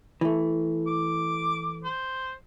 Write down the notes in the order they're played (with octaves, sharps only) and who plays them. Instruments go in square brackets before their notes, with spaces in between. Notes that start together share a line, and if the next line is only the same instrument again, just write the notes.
[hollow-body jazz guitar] E3 A3
[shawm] D6
C5